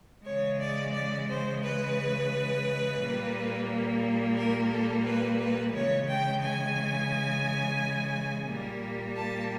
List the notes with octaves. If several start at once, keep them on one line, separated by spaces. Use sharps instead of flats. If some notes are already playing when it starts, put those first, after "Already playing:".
C#3 E3 G#3 C#5
D5
D5
C5
B4
A#2 G3 A#3
A#4
A4
B4
B4
C#3 E3 G#3 C#5
G5
G#5
A#2 G3 A#3
A5